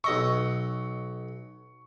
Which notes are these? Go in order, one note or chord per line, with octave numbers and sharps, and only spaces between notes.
B1 D#5 E5 C#6